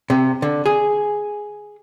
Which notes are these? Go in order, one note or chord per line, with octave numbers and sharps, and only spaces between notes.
C3
D3
G#4